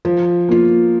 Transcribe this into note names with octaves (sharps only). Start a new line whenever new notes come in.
F3
A#3 F4